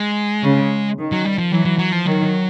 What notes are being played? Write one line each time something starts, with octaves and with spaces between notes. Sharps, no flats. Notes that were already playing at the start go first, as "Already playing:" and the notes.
Already playing: G#3
C#3
D#3
F#3
G3
F3
E3 F#3
F#3
F#3
F3
D#3 F#3